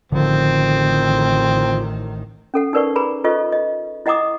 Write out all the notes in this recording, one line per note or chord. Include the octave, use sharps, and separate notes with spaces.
A1 D3 D#3 F3 C4
C#4 A4 F#5
D#4 A#4 B4 D5 F#5 C#6
G#4 B4 A#5 B5
F4 A4 B4 C5 D#5 C#6
D#5
E4 D#5 F#5 A#5 D6 D#6